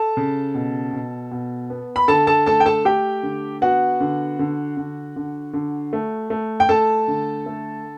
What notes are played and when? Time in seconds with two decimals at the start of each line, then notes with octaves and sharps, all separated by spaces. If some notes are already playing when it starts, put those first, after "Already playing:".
Already playing: A4 A5
0.17 C#3
0.54 B2
0.93 B2
1.31 B2
1.70 B3
1.96 B5
2.08 D3 A4 A5
2.27 A4 A5
2.46 A3 A4 A5
2.60 G5
2.66 A4 A5
2.85 A3 G4 G5
3.23 D3
3.62 B3 F#4 F#5
4.00 D3
4.39 D3
4.77 D3
5.16 D3
5.53 D3
5.93 A3
6.30 A3
6.60 G5
6.69 A3 A4 A5
7.08 D3
7.46 A3